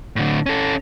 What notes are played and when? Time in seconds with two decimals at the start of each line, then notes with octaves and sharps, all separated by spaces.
0.16 A2 D3
0.46 C#4 A4